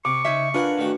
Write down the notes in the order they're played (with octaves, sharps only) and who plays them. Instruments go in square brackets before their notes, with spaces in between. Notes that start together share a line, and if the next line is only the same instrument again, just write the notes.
[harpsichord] C3 [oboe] C#6 [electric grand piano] D6
[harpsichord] C#3 [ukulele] D#4 C#5 E5
[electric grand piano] D4 B4 [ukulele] F4 [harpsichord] G#4 A#4 F#5
[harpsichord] A1 D#3 F#4